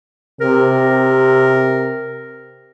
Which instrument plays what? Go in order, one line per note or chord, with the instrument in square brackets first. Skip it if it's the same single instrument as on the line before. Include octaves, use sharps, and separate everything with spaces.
[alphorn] C3 [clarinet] A#4